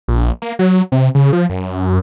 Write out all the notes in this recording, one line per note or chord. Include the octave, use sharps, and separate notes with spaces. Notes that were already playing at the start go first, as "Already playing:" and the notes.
A#1
A#3
F#3
C3
C#3
F3
F#2